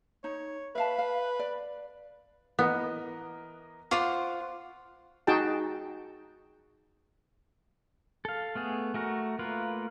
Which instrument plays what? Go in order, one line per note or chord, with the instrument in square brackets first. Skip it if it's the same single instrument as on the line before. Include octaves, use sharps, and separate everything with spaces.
[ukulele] D#4 [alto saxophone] C#5
[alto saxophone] B4 [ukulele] E5 F5 A5
[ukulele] F5
D5
[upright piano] E3 A#4 D#5 [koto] B3
[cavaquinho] F4 C5 F#5 [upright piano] F5 C#6 D6
[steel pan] D#4 F#4 G#4 G5 A5
[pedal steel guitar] A4 F5
A3 B3 G#4
A3 F#4 A#4
A3 A#3 F4 A#4 B4